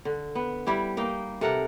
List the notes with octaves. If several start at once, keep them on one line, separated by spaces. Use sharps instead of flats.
D3
B3
G3 E4 G4
A#3 D#4 G5
C3 A4 A#4 F#5